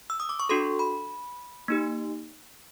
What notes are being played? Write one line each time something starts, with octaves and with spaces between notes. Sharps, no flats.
E6
D#6
D6
C#6
D4 F#4 A4 C6
B5
A#3 D#4 G4